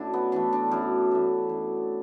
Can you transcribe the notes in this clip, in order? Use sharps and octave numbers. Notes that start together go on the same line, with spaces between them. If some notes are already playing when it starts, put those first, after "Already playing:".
Already playing: F#2 A3 D4 E4
B3
E3 A3 D4
D4
F#2
E3 A3
F#2